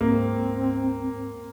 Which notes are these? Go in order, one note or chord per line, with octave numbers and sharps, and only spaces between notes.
D2 G#2 A#3 C4